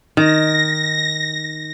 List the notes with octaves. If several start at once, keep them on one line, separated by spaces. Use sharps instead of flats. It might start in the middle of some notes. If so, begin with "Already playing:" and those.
D#3 A#6